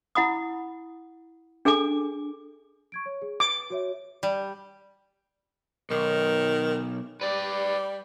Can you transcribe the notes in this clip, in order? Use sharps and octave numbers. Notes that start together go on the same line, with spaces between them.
E4 F#5 B5 D#6
D4 G#4 A4 G#5 D6
C#6 G#6 D7
C#5
G#4
B4 D6
F#4 C#5 E5
G3
B1 D#3
G3 B4 D5